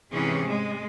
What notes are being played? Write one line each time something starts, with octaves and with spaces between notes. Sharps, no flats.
G#2 C3 E3 C#4 G#4
G#3